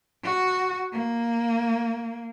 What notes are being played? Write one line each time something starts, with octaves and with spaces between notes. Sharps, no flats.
F#4
A#3